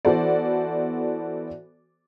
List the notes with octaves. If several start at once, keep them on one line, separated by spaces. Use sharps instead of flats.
E3 B3 F#4 A4 C5 D5